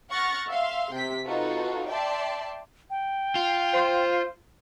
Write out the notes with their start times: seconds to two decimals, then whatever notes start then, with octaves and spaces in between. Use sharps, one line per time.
0.11 F#5 C#6 F6 A6 A#6
0.49 E5 F5 C6
0.92 C3 G5 B6
1.25 D#4 F4 F#4 A4 B4
1.88 D5 E5 G5 A5 C6
2.90 G5
3.35 F4
3.73 C5